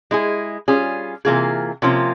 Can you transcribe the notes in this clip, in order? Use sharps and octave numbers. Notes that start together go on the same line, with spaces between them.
G#3 E4 G#4
G3 C#4 F4 G#4
C3 E3 A#3 F4 G#4
C3 F3 A#3 C#4 F4